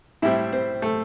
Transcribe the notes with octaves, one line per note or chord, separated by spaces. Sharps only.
A2 G3 C4 E4 E5
C4 C5
A3 A4